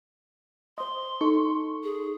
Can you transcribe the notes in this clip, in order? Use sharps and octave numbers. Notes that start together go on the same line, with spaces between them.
C5 D#5 C6
D#4 A4 C#6
G#4